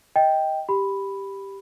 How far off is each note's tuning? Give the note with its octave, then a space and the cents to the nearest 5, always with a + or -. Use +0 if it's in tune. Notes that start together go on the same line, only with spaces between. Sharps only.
D#5 +20 G5 +0
G4 +0 B5 +0